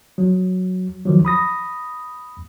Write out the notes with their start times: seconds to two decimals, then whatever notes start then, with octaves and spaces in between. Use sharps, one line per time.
0.18 F#3
1.05 D#3 F3 F#3
1.25 B5 D#6 A#6